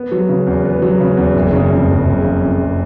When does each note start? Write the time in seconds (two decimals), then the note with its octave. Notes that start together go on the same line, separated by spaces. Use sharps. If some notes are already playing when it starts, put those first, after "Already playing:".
Already playing: B3
0.12 F#3
0.29 C#3
0.47 E2
0.65 B3
0.82 F#3
1.00 C#3
1.17 E2
1.36 F#1
1.53 C#3
1.71 F2
1.89 F#1
2.06 F#1
2.23 C#3
2.41 F2
2.59 F#1